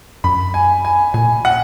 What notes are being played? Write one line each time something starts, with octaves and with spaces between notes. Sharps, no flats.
F#2 B5
G#5
G#5
A#2 G#5
F#5